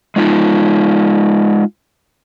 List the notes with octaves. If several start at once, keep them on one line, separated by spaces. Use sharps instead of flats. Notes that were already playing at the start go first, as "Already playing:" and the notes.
G#3 D#4 F4